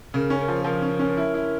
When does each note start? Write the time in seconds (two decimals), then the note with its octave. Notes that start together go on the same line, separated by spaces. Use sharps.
0.14 C#3 A#4
0.30 C#4
0.39 A#4
0.48 F3
0.64 F3 A#4
0.82 C#4
0.99 C#4
1.17 E4
1.34 E4